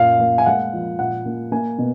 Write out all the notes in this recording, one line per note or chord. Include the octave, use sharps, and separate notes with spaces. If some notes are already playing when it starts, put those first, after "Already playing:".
Already playing: F#2 A#2 A#3 F5
A#3
G#5
G#3 F#5
F3
A#2 F#5
A#3
A#3 G#5
B2